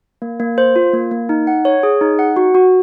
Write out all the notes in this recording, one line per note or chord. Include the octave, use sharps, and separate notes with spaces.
A#3
A#3
C5
F4
A#3
A#3
D#4
F#5
C#5
G#4
D#4
F#5
F#4
F#4